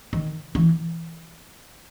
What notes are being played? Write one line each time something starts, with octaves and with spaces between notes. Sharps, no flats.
D#3
E3